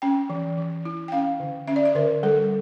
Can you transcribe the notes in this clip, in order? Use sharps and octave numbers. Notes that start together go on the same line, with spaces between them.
C#4 G5
E3
E3
E4
G5
C#4 F5
D3
C#4 E5
D5
E5
D3 A#4
G3 A4